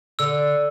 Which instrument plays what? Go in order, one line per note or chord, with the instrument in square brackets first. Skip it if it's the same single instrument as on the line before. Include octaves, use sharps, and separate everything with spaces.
[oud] D3 [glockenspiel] E6